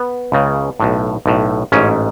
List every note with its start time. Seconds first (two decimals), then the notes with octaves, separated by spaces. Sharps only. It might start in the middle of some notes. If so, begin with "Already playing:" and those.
Already playing: B3
0.32 C#2 C#3
0.80 B1 A2
1.26 B1 A2
1.72 A1 G#2 C#4